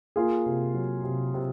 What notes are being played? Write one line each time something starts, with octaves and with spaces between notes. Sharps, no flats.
A#3 F4 G#4
C3
F#3
C3
C3